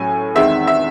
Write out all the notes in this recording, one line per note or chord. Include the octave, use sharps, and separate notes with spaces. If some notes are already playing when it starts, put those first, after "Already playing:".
Already playing: A2 F#3 C#4 G#5
E2 D#3 G#3 C4 E5
E5